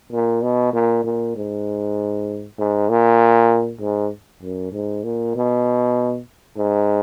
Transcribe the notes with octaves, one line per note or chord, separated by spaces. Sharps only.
A#2
B2
A#2
A#2
G#2
G#2
A#2
G#2
F#2
G#2
A#2
B2
G#2